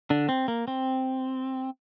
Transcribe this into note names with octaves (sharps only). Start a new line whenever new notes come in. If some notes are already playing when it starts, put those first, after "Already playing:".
D3 D4
C4
A#3
C4